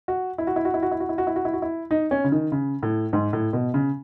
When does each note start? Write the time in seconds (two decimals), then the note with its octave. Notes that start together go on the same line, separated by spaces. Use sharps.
0.08 F#4
0.38 E4
0.47 F#4
0.56 E4
0.65 F#4
0.74 E4
0.83 F#4
0.91 E4
1.00 F#4
1.09 E4
1.18 F#4
1.27 E4
1.36 F#4
1.45 E4
1.53 F#4
1.62 E4
1.91 D#4
2.11 C#4
2.24 C#3
2.32 D#3
2.52 C#3
2.83 A2
3.13 G#2
3.33 A2
3.53 B2
3.74 C#3